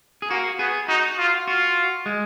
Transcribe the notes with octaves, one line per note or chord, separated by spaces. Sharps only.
G#4
A#3 F#4
B3 G#4
D#4 F#4
F4
F4 F#4
G#3